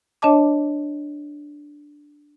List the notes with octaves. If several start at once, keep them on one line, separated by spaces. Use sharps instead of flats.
D4 C#5 D#5 A5 D6